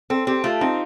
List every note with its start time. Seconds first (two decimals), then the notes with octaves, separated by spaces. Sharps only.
0.10 C4 A4
0.27 C4 G4
0.44 A3 F4
0.61 C4 D#4